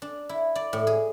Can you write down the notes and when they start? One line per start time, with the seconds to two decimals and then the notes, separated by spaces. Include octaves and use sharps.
0.02 D4
0.29 E4
0.56 D5
0.73 A2
0.87 G#4